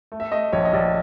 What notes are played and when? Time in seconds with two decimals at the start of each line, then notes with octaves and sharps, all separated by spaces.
0.12 A3
0.20 E5
0.32 A3 D#5
0.53 A#1 C#5
0.65 D#5
0.73 A#1 D5